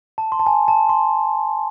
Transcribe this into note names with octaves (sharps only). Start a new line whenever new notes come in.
A5
C6
A5
G#5
A5
C6